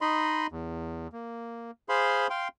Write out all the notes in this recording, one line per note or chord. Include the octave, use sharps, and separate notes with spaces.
D#4 D#5 B5 C6
E2
A#3
G#4 C5 F5 B5 C6
F5 G5 C6